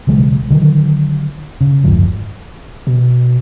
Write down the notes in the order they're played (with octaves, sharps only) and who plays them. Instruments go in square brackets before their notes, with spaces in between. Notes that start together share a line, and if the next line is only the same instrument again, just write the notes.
[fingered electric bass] B1 C#3 E3 G#3
D3 D#3 F#3
C#3
F#1 D2 G#2 F3
[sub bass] B2